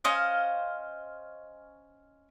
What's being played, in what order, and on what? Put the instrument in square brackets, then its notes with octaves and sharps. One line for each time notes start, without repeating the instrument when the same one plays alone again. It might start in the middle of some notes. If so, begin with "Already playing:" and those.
[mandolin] C#4 C5 D#5 F5